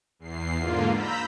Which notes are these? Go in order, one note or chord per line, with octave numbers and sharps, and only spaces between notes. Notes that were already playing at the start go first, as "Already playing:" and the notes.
E2 C7
G#2 D3 A#3 F4
A#5 B5 E6 G6 B6